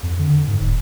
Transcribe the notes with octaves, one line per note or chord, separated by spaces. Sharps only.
F2
D3
G#2
D#1